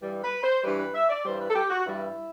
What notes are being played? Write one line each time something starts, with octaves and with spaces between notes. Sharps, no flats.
G2 E3 G3
B4
C5
G2 E3 G3 B4
B4
E5
D5
G2 E3 G3 C5
B4
A4
G4
F#4
G2 E3 G3 E4